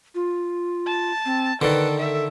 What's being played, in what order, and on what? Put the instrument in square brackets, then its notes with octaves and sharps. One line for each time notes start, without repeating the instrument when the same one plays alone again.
[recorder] F4
[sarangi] A5
[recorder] C4
[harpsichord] D3 D#3 [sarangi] A4 [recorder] B4
[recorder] A4 [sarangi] E5